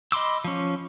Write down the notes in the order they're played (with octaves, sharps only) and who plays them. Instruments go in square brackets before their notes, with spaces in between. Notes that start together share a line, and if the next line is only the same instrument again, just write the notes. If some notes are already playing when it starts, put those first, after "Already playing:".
[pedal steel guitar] D#5 B5 C6 D6 E6
F3 C#4